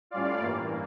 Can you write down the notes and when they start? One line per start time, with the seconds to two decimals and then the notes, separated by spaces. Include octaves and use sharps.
0.11 A2 G3 C#4 F4 D5 F5
0.41 G2 E3 A#3